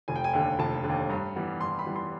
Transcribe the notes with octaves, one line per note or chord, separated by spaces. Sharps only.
F1 G#5
G5
G#5
D#2 D3
F1 A5
D3
D#2
G2 A#5
E3 G3 B3
G2 C6
B5
E3 G3 B3
C6